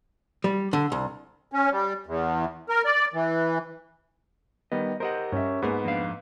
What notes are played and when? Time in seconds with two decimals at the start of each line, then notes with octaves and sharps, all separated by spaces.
0.44 G3
0.73 D3
0.92 C2
1.52 C#4
1.72 G3
2.06 E2
2.69 A#4
2.85 D5
3.14 E3
4.72 D#3 G3 B3 D#5
5.00 G4 A#4 C5 D#5 F#5
5.32 G2 C#4 E5
5.62 G#2 A#3 B3 G#4 A#4
5.85 F2 A#3 D4 F5